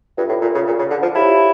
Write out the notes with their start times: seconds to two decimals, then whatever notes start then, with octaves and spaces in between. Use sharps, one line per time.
0.17 G2 F4 A4 E5
0.29 A2
0.42 A#2
0.55 C#3
0.66 A#2
0.79 C#3
0.90 D3
1.02 F3
1.15 E4 G4 C#5 F5 A5